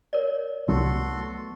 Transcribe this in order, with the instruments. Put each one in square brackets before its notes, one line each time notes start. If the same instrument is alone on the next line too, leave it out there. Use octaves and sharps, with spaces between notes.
[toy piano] A#4 C#5 D5
[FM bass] C2 [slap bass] F#3 A3 B3 [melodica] F#4 A4 C6